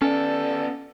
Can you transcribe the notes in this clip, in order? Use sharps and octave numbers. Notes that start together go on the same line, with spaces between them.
B3 C#4 A4 D5